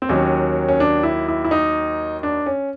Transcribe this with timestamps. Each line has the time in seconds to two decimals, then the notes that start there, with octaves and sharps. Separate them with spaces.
0.02 C4
0.09 D#2 D#3 F#3 C#4
0.69 C#4
0.80 D4
1.03 E4
1.28 E4
1.44 E4
1.51 D#4
2.23 D4
2.46 C#4